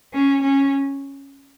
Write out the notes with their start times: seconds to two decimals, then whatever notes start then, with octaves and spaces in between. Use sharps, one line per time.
0.13 C#4
0.42 C#4